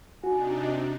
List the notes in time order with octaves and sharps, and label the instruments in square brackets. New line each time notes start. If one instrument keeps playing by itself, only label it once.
[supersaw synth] C3 D4 D#4 [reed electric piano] F#4 [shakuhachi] G#5